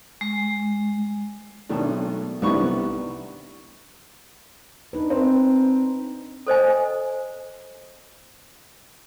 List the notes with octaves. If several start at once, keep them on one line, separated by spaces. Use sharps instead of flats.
G#3
G#1 B2 D#3 F#3 A3 D4
C2 D#3 G3 B3 D4 C#6
D4 D#4 B4
C4
A4 C5 D#5 G#5